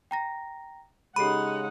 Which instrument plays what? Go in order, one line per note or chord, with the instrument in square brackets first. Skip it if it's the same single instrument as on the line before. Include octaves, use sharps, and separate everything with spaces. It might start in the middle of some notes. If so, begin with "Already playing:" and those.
[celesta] G5 A#5 A#6
[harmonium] C#3 G#3 [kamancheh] D#4 F#5 [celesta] G4 A4 D#7 [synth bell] B5